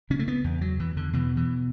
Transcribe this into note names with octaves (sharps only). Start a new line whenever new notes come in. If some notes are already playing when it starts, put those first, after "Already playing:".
C#3 C#4
A3
B3
E2
F#3
E2 E3
D3
B2 E3
E3